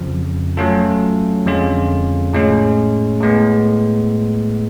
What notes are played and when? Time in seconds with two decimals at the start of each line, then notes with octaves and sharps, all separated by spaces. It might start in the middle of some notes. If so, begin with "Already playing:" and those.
Already playing: F2 C#3 F3
0.57 F#3 A3 C#4 F4 A4
1.45 F2 D3 G#3 C#4 F4
2.33 A2 G#3 C#4
3.20 A2 G#3 B3